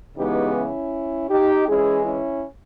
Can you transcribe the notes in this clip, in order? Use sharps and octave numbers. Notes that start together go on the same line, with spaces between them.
C#3 E3 G#3 B3 D#4 G4
C#4 E4
D#4 G4
E3 G#3 C#4 E4 G#4
C#4 E4